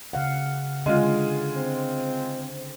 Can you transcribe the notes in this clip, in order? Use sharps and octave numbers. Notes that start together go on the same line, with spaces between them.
C#3 F5 F#5
D3 G#3 C#4 F4 G#4
C4